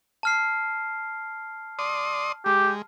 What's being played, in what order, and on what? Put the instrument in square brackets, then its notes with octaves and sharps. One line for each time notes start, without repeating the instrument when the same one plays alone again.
[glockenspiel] A5 F6 C7
[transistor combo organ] D5 C6 D#6
[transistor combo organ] G#3 [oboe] G4